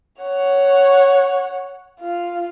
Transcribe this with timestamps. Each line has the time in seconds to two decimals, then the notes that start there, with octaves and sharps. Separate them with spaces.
0.22 C#5 F#5
2.00 F4